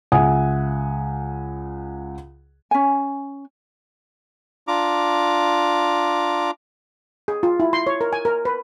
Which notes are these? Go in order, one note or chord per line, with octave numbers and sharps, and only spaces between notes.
C#2 E5 F#5 G#5 D#6
C#4 G#5
D4 F4 A#5 D6
G#4
F4
E4
C6
C#5
A#4
G#5
A#4
B4